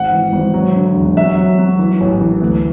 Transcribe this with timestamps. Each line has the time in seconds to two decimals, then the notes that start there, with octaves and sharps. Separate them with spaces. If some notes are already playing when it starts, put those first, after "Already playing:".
Already playing: G#1 F#5
0.12 E3
0.33 G#1
0.54 F#3
0.75 D3
0.96 E1
1.17 F#3 E5
1.38 F#3
1.59 F#3
1.79 E3
2.01 A1
2.21 E3
2.42 D2